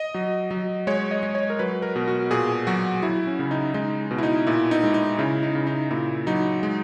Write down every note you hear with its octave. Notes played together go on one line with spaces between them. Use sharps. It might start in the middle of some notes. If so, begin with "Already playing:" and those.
Already playing: D#5
F#3
F#3
G#3 C#5
D#5
G#3
C#5
A#4
F#3 B4
A#4
B2
F#4
A#2 G#4
F#3 F#4
F#3 E4
C#4
C#3
D#4
G#3 D#4
B2
E4
D#4
A#2 E4
D#4
G#3
D#4
C#3 E4
D#4
C#3
D#4
A#2 E4
F#3 D#4
G#3